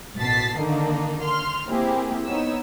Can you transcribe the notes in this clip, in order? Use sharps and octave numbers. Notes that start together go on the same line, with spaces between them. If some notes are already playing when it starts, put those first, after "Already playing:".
A1 B2 A5 A6 B6 C7
D3 D#3 A#3 D4 D#4
C6 F6
A#3 C4 E4 G4 G#4
B3 D#4 C#5 E6